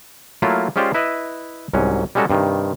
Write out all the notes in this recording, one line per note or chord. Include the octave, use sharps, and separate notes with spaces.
F#3 A3 A#3 E4 F4
G#3 C#4 F4 G4 C5 D5
E4 B4 D#5 E5
C2 G#2 F#3 C#4
G3 G#3 C#4 F#4 A4 A#4
G2 C3 D#3